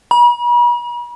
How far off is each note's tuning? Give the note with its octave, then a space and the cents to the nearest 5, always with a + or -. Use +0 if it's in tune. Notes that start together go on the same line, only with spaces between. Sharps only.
B5 -45